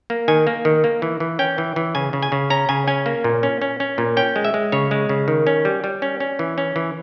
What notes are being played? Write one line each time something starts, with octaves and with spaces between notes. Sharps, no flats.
A#3
D#3 G#5
A#3
D#3
A#3
E3
E3
C#4 G5
E3
E3
C#3 G#5
C#3
G#5
C#3
C#4 A#5
C#3 G#5
C#4 G#5
A#3
A#2
C#4
C#4
C#4
A#2
C#4 G5
G#3
E5
G#3
C#3 C#5
G#3
C#3
D#3
C#4
G3
G3
C#4
C#4
E3
C#4
E3